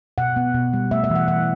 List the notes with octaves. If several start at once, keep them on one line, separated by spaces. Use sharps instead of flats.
B2 F#5
B3
B2
G3
A3 E5
E5
E3
F#5
E3 F#5